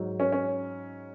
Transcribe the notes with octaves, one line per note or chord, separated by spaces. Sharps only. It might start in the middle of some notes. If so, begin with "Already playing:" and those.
Already playing: G#2 F#3
C#4
C#4